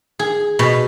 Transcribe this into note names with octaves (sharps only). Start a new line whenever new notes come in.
G#4
B2